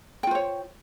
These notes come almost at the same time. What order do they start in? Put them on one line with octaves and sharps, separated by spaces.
G5 F4 C5 C#5